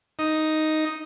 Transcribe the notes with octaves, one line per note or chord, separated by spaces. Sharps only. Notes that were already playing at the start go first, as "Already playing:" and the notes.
D#4